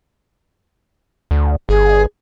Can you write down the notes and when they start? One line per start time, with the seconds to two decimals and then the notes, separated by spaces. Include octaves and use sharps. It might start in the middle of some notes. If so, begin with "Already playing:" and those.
1.31 D2
1.69 G1 G#4